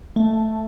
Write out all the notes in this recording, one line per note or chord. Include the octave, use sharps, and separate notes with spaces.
A3